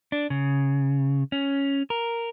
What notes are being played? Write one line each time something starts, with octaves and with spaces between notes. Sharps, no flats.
D4
C#3
C#4
A#4